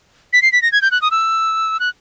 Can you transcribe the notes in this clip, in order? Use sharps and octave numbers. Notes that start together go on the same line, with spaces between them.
B6
C7
B6
A#6
G#6
G6
F#6
D#6
E6
F#6